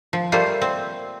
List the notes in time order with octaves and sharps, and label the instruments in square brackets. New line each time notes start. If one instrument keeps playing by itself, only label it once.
[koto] F3
G3 A3 A#3 F4 C5
C4